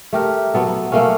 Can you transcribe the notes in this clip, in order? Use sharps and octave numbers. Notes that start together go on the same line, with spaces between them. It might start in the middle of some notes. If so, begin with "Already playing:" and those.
A3 G4 A#4
F#3 B3 A4
B3
A3 A#3 C#4